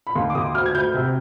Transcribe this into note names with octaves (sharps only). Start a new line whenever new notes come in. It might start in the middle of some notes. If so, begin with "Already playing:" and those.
B5
D#2 C6
D6
D#2 D#6
D2 F6
G#6
D2 G6
C3